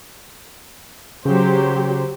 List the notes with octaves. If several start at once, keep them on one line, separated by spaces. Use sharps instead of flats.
C#3 F#3 G4 C5